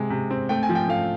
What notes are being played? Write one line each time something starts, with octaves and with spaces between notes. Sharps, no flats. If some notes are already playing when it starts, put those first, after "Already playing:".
Already playing: C3 G#3 G#5
C3
C4
A3 G5
G#5
F3
G5
A3 F5